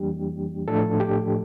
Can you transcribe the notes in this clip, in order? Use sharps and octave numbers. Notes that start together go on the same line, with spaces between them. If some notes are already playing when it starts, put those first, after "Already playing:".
Already playing: F2 E3 G3 A#3 D4 G4
A2 F3 A3 D4 A4
G4